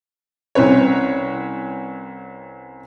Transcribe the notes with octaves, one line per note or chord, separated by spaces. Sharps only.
C2 C4 C#4 B4 C#5